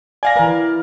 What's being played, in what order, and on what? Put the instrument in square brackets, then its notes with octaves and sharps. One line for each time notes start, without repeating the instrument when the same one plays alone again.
[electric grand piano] D5 F5 A#6 [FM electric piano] G#5
[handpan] E3 B4 [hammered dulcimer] A#4